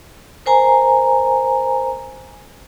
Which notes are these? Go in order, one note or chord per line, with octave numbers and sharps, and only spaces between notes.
A#4 C5 G#5 A#5